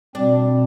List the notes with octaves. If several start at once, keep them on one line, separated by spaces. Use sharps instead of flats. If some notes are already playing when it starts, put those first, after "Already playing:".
B2 G3 C4 D4